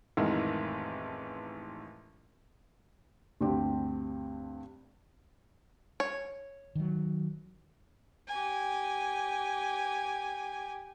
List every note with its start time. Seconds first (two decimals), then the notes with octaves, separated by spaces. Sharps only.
0.17 A1 F2 D#3 E3 G#3 A#4
3.40 D2 G2 C4 G4
6.00 C#5
6.75 D#3 E3 F#3
8.28 G4 G#5